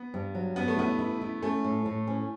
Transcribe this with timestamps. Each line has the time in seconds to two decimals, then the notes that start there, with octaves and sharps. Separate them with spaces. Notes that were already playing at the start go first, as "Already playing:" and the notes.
Already playing: B3
0.14 G2
0.35 F#3
0.56 G2 B3
0.68 A3
0.78 B3 E4
0.99 E4
1.21 E4
1.42 A3 C#4
1.64 A2
1.86 A2
2.07 C#4